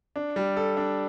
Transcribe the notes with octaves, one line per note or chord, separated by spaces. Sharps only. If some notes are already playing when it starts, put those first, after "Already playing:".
D4
G3
A4
D4